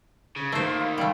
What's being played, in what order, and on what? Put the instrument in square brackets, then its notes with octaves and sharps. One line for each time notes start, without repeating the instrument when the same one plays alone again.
[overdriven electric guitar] C#3
[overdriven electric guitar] D#3 A#3 [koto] A3 C5
[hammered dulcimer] F4
F5 B5
[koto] G3 A3 [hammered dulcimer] G5